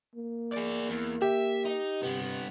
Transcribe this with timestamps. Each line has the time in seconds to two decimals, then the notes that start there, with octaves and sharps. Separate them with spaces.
0.16 A#3
0.52 G#4 D5
0.89 E2
1.22 G4 E5
1.65 D#4
2.03 G2 C3 B3